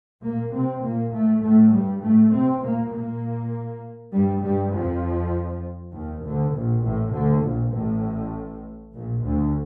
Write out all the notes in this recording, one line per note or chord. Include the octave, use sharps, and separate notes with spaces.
A#2 A#3
C3 C4
A#2 A#3
A2 A3
A2 A3
G2 G3
A2 A3
C3 C4
A#2 A#3
A#2 A#3
G2 G3
G2 G3
F2 F3
D#2 D#3
D2 D3
A#1 A#2
A1 A2
D2 D3
A#1 A#2
A1 A2
A#1 A#2
D2 D3